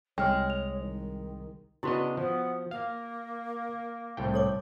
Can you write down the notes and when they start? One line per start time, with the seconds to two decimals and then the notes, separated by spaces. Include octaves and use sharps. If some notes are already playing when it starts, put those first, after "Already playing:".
0.18 C2 G#3 C#5 G5 F6
0.50 F7
0.79 D#3
1.83 C#3 B3 D4 E4 F#4 D#5
2.17 F3 B3
2.71 A#3 F5
4.17 C2 A2 G5
4.34 A4 C#5 D6